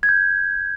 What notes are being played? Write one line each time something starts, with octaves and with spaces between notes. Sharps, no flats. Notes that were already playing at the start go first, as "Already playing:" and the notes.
G#6
G6